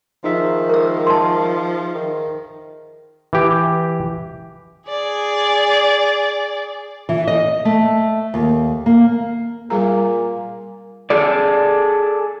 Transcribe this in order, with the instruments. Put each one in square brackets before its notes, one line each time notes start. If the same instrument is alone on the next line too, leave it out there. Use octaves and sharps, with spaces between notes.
[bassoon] D#3 [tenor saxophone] F3 [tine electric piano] D#4 G#4 E5
[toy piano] A#4 E6
A5 C6
[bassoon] D#3
[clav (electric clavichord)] E3 G4
[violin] G#4 D5
[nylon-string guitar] E3
D#5
A3
D#2
A#3
[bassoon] A#2 [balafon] G3 G#4 A#5
[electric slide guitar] G#4 A4 D5